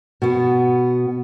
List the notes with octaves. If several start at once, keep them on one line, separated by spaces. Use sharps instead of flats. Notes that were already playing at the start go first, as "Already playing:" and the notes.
B2 B3